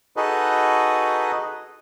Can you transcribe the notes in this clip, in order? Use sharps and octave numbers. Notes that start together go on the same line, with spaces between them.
D#4 F#4 G#4 A4 B4 D#5